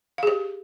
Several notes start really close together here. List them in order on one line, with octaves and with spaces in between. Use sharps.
F5 G#4 G4